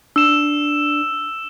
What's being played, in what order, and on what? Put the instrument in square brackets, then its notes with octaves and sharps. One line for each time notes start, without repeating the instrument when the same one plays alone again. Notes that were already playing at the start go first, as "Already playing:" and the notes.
[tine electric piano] D4 [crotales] E6 E7